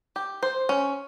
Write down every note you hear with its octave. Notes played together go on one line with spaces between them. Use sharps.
G4
C5
C#4